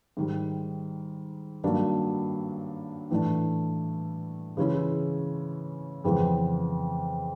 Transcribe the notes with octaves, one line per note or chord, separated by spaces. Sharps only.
G#2 D#3 G3
G2 D#3 F#3 A#3 D4
A2 E3 A3 D4
C#3 E3 G#3 C#4 E4
F2 C#3 E3 G#3 B3